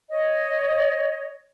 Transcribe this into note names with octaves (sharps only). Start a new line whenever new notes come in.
C#5 D#5